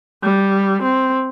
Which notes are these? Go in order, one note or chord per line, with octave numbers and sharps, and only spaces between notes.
G3
C4